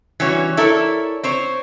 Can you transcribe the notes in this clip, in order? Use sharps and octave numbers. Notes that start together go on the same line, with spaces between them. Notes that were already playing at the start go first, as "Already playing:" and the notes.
E3 G3 C#4 F#4 C#5
E4 A4 A#4 C#5 D5
C4 C5 C#5